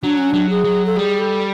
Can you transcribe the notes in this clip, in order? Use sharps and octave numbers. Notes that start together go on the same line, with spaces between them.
F#3 D4
C#4
F#3 D4
G#4
F#3
A4
G3 G#4
A4